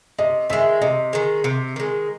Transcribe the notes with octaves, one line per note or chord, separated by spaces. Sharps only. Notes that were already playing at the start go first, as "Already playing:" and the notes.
C3 D#5
D#3 G#3 E5
C3 D#5
D#3 G#3
C3
D#3 G#3